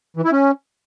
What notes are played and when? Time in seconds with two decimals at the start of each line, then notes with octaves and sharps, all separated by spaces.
0.17 E3
0.24 E4
0.32 C#4